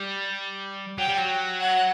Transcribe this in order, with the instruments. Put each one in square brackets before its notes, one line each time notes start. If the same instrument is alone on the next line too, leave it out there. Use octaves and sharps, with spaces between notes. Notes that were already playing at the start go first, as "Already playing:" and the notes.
Already playing: [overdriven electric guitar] G3
[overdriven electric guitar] F#3 [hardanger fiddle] G5
[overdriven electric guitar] G3
F#3
[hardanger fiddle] F#5